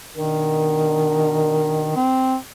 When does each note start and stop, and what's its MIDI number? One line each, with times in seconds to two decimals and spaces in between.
0.18 2.03 47
0.18 1.95 51
0.18 2.03 62
0.18 2.03 70
1.96 2.36 60